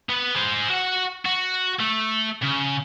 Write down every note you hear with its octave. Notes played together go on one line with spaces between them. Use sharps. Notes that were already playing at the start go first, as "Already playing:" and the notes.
B3
G#4 C5
F#4 F#5
F#4
A3
C#3